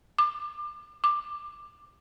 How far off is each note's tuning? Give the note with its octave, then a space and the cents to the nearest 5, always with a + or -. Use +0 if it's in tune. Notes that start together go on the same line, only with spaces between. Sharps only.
D6 +30
D6 +15